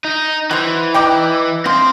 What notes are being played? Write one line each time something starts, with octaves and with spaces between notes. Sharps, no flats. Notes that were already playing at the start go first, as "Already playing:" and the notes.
D#4
E3 F#4 C5
D#4 D5 G5
F3 C4 C6